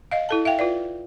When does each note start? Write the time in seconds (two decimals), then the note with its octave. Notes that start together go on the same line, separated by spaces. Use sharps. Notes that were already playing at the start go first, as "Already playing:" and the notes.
0.11 D#5 F5
0.29 E4 A4 A5
0.45 E5 F5 G5
0.59 F4 B4 D5